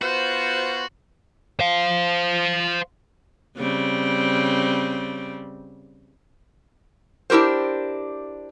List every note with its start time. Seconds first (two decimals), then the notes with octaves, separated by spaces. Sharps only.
0.02 B3 F4 F#4 C5
1.60 C5 F5
3.57 C#3 G3 C4
7.30 D4 E4 G4 A#4 C5